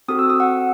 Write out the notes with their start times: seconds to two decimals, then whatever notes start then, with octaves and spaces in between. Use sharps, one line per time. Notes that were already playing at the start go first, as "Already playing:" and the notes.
0.08 C4 F#4 A4 D#6
0.19 E6
0.30 D#6
0.40 F#5